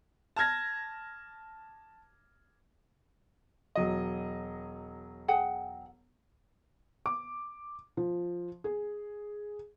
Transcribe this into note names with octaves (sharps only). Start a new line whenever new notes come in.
A5 F6 G#6 A#6
E1 F#3 D#5
G#4 F#5 G5
D6
F3
G#4